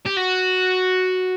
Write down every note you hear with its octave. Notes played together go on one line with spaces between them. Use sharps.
G4
F#4